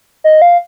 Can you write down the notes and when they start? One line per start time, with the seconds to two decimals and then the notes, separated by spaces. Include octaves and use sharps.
0.24 D#5
0.42 F5